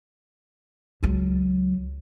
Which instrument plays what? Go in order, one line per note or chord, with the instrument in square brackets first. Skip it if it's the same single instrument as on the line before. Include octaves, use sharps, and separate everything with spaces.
[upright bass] C#2 F#3